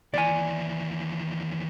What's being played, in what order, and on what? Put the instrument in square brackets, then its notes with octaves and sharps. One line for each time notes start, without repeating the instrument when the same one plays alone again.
[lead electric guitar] D#2 E3 [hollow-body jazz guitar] D5 G#5